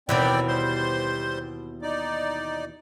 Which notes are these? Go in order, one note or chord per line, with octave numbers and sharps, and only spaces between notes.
D#2 B2 E3 C4 D5 G5
G3 C5 C6
D#4 D5